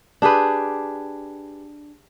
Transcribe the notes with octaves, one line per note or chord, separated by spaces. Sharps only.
D4 G4 G#4 B4